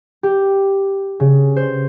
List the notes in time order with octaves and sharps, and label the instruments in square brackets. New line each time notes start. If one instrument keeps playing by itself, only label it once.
[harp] G4
C#3
C5